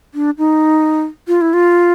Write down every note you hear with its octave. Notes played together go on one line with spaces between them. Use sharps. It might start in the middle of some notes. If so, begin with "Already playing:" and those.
D4
D#4
F4
E4
F4